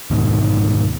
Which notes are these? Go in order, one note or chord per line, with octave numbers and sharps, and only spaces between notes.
D2 G#2 B2 D#3